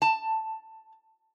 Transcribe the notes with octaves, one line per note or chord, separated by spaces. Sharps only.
A5